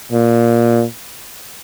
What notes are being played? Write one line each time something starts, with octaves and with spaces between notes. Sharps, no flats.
A#2